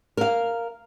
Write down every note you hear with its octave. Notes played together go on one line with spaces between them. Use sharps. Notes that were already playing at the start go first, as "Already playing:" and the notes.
A#4 F5